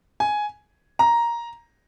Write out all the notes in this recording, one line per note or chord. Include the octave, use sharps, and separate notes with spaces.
G#5
A#5